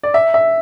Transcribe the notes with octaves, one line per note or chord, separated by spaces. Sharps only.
D5
E5
E5